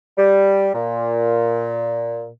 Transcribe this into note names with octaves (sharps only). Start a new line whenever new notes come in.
G3
A#2